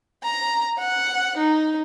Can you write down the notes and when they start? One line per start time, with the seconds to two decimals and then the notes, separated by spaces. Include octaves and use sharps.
0.23 A#5
0.79 F#5
1.37 D#4